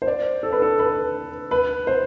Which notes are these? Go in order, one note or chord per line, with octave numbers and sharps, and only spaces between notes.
C5
D5
A4
B4
A4
B4
B4
C5